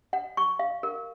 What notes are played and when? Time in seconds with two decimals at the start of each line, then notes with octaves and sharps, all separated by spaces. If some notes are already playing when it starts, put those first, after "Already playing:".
0.13 F#5
0.37 C#6
0.59 F5
0.83 A#4